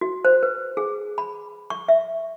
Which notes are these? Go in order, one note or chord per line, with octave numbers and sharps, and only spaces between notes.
F#4
C5
B4
G#4
B5
C#6
E5